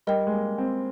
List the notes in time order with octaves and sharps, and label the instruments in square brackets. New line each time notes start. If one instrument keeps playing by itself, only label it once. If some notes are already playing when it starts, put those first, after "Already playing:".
[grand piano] G3 [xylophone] A#4 D#5 G5
[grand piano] G#3
A#3
C4